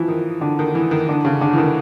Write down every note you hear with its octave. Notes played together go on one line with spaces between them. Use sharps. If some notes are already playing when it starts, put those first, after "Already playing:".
Already playing: E3 F3
D#3
D3
D#3
E3
D#3
D3
C#3
D3
E3
D#3